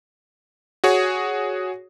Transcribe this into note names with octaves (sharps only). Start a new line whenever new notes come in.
F#4 G#4 C#5